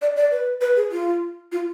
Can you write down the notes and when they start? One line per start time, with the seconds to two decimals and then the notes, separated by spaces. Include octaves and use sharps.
0.02 D5
0.16 D5
0.31 B4
0.61 B4
0.76 G#4
0.92 F4
1.52 F4